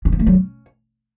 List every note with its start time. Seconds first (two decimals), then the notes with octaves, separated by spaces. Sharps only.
0.05 C#4
0.12 B3
0.19 A3
0.27 F#3
0.34 C#4